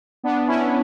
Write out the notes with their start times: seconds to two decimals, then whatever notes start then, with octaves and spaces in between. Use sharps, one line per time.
0.23 B3 D4
0.47 C#4 E4